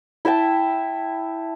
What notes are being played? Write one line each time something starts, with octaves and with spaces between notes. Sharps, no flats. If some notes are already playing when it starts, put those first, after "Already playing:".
E4 E5 G5 A5